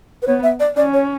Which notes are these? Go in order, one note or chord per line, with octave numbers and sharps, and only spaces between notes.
B4
B3 C#5
E5
D5
C#4 D5
C#5